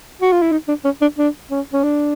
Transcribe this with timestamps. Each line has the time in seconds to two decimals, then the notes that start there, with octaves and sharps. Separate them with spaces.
0.21 F#4
0.32 F4
0.42 E4
0.52 D#4
0.68 D4
0.84 C#4
1.01 D4
1.18 D4
1.50 C#4
1.72 C#4
1.83 D4